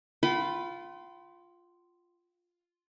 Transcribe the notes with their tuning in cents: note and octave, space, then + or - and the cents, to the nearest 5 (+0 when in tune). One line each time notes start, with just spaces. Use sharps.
F4 +0 G5 -45 B5 +0